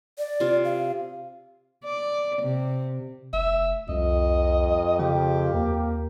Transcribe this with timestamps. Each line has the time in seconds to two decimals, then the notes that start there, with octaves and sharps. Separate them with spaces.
0.18 D5
0.40 C3 F4
0.65 F5
1.84 D5
2.41 C3
3.33 F1 E5
3.89 C2 F2 D#5
4.99 C#3 G4
5.54 D#2 A#3